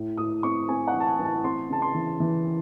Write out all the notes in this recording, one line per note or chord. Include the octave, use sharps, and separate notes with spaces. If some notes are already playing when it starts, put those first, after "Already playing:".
Already playing: A2
A2 D#6
C4 C#6
C4 G#5
F#5
A1
A5
G#5
A1
A5
C4 C6
C#3 A5
C6
E3
E3